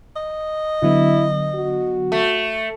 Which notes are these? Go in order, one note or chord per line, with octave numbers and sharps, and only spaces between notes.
D#5
D3 F#3 B3 E4
F#4
A3